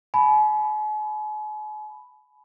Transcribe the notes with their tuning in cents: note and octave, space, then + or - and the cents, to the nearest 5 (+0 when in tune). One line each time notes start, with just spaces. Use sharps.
G#5 +45 B5 +0